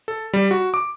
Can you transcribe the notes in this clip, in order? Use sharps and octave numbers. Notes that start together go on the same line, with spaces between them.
A4
G3
F#4
D6